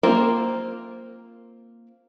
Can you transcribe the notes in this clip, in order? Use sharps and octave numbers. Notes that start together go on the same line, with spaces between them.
A#3 C4 F4 A#4 C5